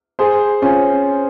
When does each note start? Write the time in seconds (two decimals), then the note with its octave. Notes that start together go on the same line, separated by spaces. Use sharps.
0.19 G#4 C5
0.62 C#4 F4